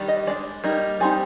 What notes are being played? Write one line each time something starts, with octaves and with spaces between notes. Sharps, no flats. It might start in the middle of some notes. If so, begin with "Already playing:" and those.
Already playing: D#3 G3 D4
D#5
G#3 D4 D5
G3 A#3 D#4
G3 C4 D#4 G#5